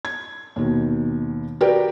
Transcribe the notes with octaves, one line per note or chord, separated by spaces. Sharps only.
G#6
D#2 B2 D#3
F#4 G4 A#4 B4 D5 G5